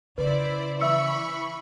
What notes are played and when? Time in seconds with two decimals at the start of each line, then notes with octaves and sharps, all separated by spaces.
0.18 C#3 E4 B4 C5 D5
0.81 E3 E5 B5 C#6 E6 C#7